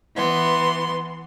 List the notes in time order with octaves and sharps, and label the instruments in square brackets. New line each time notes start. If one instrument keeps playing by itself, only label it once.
[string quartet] E3 B3 C6